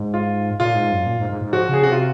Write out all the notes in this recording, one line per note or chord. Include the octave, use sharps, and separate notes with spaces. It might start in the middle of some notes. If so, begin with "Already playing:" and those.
Already playing: G#2
F4
A#2 F4
G#2
F#2
A#2
G#2
G#2
G#2
F3 F#4
C#3 G#4
C3 F#4
F4